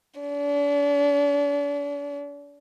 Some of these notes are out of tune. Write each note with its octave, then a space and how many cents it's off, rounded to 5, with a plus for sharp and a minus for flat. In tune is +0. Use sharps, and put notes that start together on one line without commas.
D4 -40